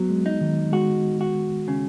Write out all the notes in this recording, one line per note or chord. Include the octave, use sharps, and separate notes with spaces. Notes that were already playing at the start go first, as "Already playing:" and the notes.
Already playing: F#3 B3
G#3
D#4
D#3
G#3 F#4
F#4
C#3